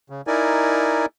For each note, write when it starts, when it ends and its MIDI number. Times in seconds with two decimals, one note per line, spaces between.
0.10 0.21 49
0.27 1.06 63
0.27 1.06 64
0.27 1.06 70
0.27 1.06 74
0.27 1.06 80